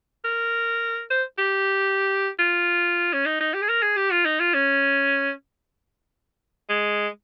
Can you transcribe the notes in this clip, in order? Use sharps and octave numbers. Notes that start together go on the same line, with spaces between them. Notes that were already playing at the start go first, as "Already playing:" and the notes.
A#4
C5
G4
F4
C#4
D#4
D#4
G4
G#4
A#4
G#4
G4
F4
D#4
F4
C#4
G#3